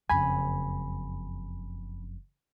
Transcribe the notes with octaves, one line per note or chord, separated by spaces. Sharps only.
F#1 F2 G#5 B5